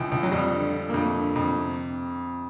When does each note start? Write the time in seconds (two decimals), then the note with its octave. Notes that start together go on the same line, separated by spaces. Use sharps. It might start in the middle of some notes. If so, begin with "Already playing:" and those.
Already playing: C#2 E3
0.12 C#2
0.23 F#3
0.31 F2 G3
0.52 D3
0.73 D3
0.89 A#3
0.94 F2 A3
1.15 D3
1.36 F2
1.56 C3